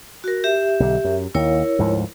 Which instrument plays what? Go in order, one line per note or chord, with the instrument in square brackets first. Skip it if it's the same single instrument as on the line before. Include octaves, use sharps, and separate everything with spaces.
[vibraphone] F#4 A#4
G4 E5
[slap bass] B1 D3
F#2
[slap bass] D#2 [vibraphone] E4 A#4 C#5
[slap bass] D2 G#2 F3